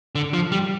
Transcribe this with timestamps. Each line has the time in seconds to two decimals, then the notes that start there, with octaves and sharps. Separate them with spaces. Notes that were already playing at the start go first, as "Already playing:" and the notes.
0.15 D3
0.34 F3
0.52 G3